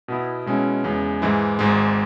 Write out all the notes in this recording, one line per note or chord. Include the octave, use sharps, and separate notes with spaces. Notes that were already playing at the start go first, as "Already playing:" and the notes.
B2 B3 E4
B2 G#3 C#4 E4
E2 C#3 G#3
G#2 E3 G#3 E4
G#1 G#2 G#3